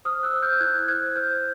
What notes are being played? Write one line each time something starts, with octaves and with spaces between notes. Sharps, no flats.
C5 D#6 F6
E6 F#6
C5
F6 G6
E4 F#6 G#6
C5 F#6 G#6
C5 F6 G6